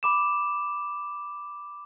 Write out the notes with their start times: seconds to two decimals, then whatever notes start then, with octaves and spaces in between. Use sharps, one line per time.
0.03 B5 D6 E7